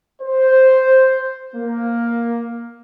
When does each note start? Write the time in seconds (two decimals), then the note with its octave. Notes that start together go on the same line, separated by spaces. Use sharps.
0.22 C5
1.55 A#3